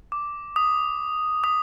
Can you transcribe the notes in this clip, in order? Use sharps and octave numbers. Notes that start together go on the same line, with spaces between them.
D6
D#6
D#6